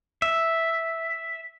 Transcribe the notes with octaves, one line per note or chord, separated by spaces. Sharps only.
E5